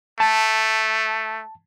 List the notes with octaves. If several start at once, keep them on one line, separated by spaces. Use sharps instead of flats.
A3 A5